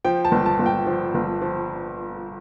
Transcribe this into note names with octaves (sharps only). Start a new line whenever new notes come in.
F3 G5
A5
G1
A5
G1
G5
F3
G1
F3